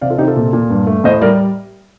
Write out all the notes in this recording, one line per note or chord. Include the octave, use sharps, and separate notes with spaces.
C3 D5 F5
F4 A4
C3 D#4 G4
F4 A4
A#2
A#2
G2
A3
A2 C5 D#5
G3 A#4 D5